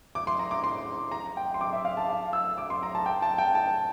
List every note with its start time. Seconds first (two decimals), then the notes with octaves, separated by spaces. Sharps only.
0.15 D6
0.27 C6
0.39 A#5
0.51 D6
0.64 C6
1.12 A#5
1.37 G5
1.54 C6
1.61 D6
1.73 E5
1.85 F5
1.97 A5
2.09 F5
2.33 E6
2.58 D6
2.70 C6
2.83 A#5
2.95 A5
3.06 G5
3.22 A5
3.38 G5
3.55 A5